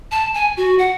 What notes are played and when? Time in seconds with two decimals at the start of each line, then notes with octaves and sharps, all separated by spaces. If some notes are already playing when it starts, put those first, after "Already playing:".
0.11 A5
0.34 G#5
0.57 F#4
0.79 F#5